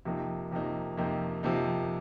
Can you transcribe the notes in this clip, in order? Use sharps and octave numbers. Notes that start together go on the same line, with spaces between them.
F2 C3 F3 A#3 D#4
F2 C3 F3 A#3 D#4
F2 C3 F3 A#3 D#4
F2 C3 F3 A#3 D#4